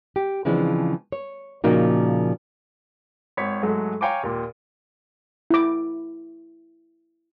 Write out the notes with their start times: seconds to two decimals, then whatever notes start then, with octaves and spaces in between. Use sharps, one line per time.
0.16 G4
0.45 C#3 E3 F3 G#3 C4 D4
1.12 C#5
1.64 A#2 C#3 F3 A#3 D#4 F#4
3.37 G#1 C#5 B6
3.63 G#2 F#3 G#3 A3
4.01 C#5 F5 G5 G#5 A#5 D6
4.23 D#2 A#2
5.51 E4 D6